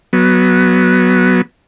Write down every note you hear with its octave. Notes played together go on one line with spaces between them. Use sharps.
F#3 B3